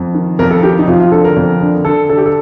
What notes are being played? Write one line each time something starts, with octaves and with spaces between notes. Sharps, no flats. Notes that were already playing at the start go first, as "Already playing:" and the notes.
Already playing: F2
D#3
F2 A#4
A4
D#3 G4
D#4
F2 F4
F4
D3 A4
A#4
F2
D3
D3 A4
D3 A4
G4
A4